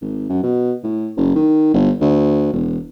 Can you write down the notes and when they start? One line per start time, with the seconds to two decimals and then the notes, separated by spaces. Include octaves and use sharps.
0.01 G#1
0.29 F#2
0.43 B2
0.83 A2
1.17 F#1
1.36 D#3
1.74 G1
2.01 D2
2.53 E1